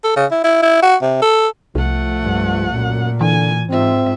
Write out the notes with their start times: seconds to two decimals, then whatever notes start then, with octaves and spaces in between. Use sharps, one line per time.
0.04 A4
0.16 C#3
0.31 E4
0.44 E4
0.63 E4
0.83 F#4
1.02 C3
1.22 A4
1.75 C2 F3 A3 F#5
2.22 G2
2.74 F#2 A#2
3.21 D3 E3 G#5
3.70 G#2 C4 F4 E5